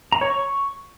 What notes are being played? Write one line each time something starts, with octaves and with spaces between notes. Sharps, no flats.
A#5
C#5
C#6